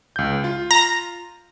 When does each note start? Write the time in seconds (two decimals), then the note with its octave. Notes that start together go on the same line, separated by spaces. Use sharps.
0.16 C#2 G6
0.44 F4
0.71 A#5